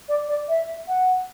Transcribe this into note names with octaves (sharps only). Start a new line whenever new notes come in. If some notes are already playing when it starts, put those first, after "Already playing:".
D5
D5
E5
F#5